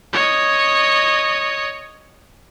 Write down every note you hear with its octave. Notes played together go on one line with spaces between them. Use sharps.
C#5 D#5